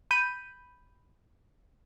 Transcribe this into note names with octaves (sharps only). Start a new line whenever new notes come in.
B5 G6 D#7